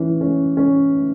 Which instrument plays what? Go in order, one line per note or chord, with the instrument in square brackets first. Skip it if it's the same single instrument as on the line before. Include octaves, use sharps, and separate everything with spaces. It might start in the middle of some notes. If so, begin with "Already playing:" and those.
Already playing: [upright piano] E3 C#4
C#4
C#4